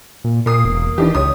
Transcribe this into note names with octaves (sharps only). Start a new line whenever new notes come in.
A#2
A#2 A#3 D#6 C7
E1
D#3 E3 D4 G4
C#2 C#5 D#6